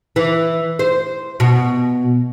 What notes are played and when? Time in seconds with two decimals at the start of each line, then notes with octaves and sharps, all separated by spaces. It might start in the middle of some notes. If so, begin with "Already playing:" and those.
0.16 E3
0.79 C5
1.40 B2